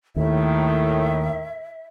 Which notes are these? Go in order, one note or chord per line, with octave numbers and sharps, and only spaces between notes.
D#2 A2 D#3 E5